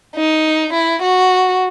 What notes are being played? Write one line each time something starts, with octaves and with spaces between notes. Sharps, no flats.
D#4
E4
F#4